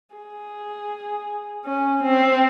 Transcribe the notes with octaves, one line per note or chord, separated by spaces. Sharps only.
G#4
C#4
C4